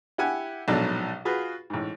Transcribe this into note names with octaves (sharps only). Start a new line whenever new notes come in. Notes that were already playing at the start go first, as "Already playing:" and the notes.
E4 G4 F#5 G#5
A#1 G#2 B2 F#3 A4 D5
F4 F#4 G#4 B4
A1 G#2